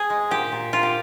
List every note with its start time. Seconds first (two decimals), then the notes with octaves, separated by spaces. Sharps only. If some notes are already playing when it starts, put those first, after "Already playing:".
Already playing: G#4
0.10 G#3
0.31 A#2 G4
0.52 A#2
0.73 A#2 F4
0.83 G4